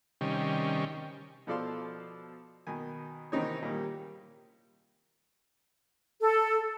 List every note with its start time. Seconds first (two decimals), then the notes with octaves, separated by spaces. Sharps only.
0.21 C3 D#3 G3 C#4
1.47 B2 F3 A4 D5 F5 C6
2.67 B2 D#3 G#5
3.32 C3 D#3 E3 C4 D#4 C#5
3.62 A#2 D#3 G3
6.22 A4